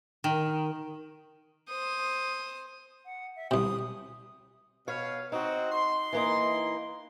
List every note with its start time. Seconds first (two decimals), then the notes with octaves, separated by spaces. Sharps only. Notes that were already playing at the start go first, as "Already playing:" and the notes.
0.24 D#3
1.68 C5 D#6
3.05 F#5
3.36 E5
3.51 C2 C3 D#6
4.88 B2 B4 C#5 F5
5.32 C4 D#4 F#4
5.72 C6
6.13 E3 A#3 D#4